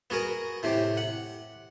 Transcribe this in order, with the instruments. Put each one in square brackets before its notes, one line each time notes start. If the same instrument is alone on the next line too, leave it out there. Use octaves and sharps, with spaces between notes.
[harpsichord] B3 F#4 G#4 A#4
A2 C3 G4
F#5